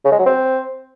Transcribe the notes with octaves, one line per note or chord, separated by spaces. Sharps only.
C#3
G#3
F#3
C4